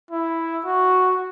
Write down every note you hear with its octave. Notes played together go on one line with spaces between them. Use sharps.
E4
F#4